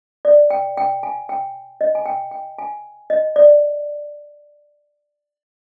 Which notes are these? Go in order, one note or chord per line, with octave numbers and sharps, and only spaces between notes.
D5
G5
G5
G#5
G5
D#5
G#5
G5
G5
G#5
D#5
D5